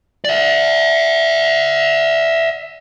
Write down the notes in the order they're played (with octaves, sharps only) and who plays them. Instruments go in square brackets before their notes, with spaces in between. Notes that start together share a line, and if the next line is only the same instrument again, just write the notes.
[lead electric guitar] D5 E5